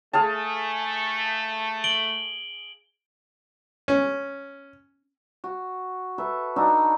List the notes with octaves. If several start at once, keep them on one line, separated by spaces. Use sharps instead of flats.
A3 G#4 F5 A5
D7 F#7 G7
C#4
F#4
A4 B4 E5
D4 D#4 F#4 A4